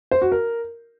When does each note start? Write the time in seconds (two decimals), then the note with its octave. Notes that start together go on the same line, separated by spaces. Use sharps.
0.11 C5
0.22 F#4
0.32 A#4